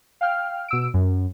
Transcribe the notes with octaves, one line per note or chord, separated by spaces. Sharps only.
F5 G5 F6
B2 E6 D7
F#2